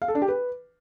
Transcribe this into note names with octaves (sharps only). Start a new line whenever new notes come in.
F5
A4
D4
G4
B4